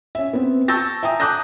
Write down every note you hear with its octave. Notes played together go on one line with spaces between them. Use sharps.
C#4 E5
B3 C4
A5 C#6 E6 G6 A6 A#6
E5 G5 G#5 A#5 D#6
A5 D6 D#6 F#6 G6 A#6